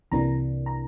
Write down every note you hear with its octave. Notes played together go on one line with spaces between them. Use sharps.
C2 C3 E3 A#3 D4 A#5
A#5